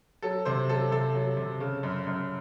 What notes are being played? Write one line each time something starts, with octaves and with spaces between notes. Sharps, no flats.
F#3 A4
C3 C5
F#3 A4
C3 A4
F#3
C3
C#3
F#2
F#2